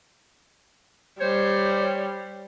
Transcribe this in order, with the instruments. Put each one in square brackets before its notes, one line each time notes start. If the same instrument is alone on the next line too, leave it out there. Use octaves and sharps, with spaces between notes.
[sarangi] G3 [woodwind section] C5 C#5